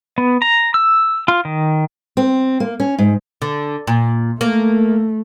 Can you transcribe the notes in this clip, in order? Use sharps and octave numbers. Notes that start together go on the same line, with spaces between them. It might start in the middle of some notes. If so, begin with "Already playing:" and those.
B3
A#5
E6
F4
D#3
C4
A#3
C#4
G#2
D3
A#2
A3 A#3